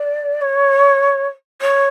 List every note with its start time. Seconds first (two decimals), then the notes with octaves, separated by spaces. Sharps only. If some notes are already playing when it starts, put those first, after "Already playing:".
Already playing: D5
0.41 C#5
1.61 C#5